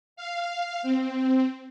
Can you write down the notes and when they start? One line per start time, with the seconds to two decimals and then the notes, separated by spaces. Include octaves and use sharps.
0.16 F5
0.83 C4